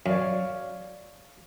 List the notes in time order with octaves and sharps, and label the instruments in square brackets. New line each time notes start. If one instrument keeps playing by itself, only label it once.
[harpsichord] F#2 [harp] C#5 D5 F5